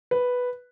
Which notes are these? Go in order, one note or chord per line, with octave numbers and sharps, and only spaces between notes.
B4